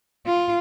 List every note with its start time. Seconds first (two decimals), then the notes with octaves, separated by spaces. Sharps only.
0.27 F4